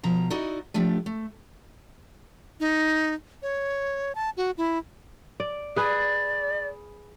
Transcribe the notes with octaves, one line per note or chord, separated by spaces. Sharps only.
B2 F3 A#5
D#4 E4 F#4 D5 D#5
F3 A3 D4 G4
A3
D#4
C#5
A5
F#4
E4
D5
G#4 B4 D5